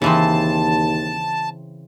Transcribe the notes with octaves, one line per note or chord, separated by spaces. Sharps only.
D#2 C#3 E3 C4 A5